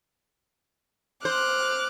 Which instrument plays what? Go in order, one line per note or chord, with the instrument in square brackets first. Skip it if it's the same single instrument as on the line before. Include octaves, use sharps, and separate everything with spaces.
[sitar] C5 [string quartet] D6 F6 F#6